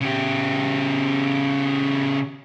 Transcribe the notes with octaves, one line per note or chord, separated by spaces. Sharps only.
C#3 G4